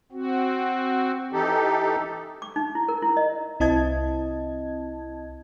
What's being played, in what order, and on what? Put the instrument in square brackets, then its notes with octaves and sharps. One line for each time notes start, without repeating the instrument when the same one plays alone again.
[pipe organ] C4 F#4
[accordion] E3 D#4 G4 A4
[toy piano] D6
D#4
E4
A#4
E4
D#5
[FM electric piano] C2 C4 E4 D#5 A5 G#6